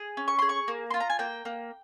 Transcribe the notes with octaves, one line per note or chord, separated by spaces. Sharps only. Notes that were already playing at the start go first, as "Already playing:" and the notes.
Already playing: G#4
C#4
C#6
G#4 C6
C#6
A#3
F4 C6
A#5
G#5
A#3 G5
A#3